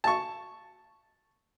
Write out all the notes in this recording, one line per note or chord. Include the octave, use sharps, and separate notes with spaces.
A5 C#6